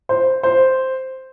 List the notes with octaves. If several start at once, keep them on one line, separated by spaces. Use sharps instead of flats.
C5
C5